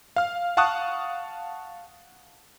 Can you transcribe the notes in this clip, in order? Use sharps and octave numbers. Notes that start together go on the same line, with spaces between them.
F5 F6
F5 F#5 A5 C#6 D#6 F#6